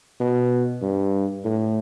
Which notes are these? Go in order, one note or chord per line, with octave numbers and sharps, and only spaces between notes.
B2
G2
A2